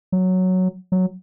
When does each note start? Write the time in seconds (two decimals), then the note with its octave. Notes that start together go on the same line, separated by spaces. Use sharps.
0.12 F#3
0.92 F#3